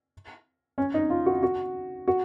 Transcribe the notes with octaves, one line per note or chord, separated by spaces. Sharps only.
C#4
D#4
F4
F#4
F#4
F#4